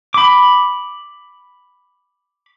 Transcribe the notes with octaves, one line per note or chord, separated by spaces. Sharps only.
B5 D6